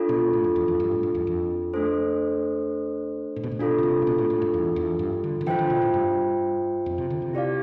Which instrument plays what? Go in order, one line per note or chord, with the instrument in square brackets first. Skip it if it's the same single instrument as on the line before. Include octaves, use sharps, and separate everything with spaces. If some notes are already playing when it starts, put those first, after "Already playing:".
Already playing: [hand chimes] D4 F4 A4
[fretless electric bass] B2
A2
F2
E2
F2
G2
A2
G2
E2
F2
[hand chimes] A3 D4 A4 C5
[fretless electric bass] A2
B2
A2
[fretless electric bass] B2 [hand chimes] D4 F4 A4
[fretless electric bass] B2
C3
A2
B2
A2
A2
G2
E2
E2
G2
D3
D3
[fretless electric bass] E3 [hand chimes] F4 C5 E5 G5
[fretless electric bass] D3
B2
A2
G2
F2
C3
D3
C3
[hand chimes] E4 G4 D5 F5